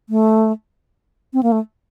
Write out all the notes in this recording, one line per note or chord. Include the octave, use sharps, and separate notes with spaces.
A3
C4
A#3
A3